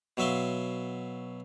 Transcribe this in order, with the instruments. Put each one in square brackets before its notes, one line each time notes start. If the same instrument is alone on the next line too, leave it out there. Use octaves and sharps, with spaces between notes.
[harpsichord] B2 F#3 E5 F5 C6